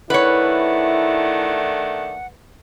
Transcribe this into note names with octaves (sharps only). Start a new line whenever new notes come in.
D#3 A3 D4 E4 B4 C#5 F#5